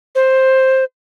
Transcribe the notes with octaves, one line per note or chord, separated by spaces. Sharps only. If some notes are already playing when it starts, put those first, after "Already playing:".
C5